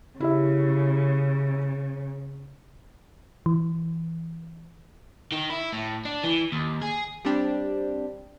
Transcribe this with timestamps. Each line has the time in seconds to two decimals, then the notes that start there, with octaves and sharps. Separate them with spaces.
0.20 C#3 E4 G4 E5
3.46 E3
5.32 D#3
5.50 E4
5.73 A2
6.05 D4
6.24 E3
6.52 D#2
6.82 G#4
7.25 G3 C4 D4 G4